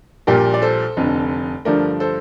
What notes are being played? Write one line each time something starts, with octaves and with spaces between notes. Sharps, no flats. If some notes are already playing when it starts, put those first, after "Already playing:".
A#1 A#2 G3 G4 A#4
D5
A4 C5
F1 F2 D3
G2 D3 F3 A3 A#4 D5
A4 C5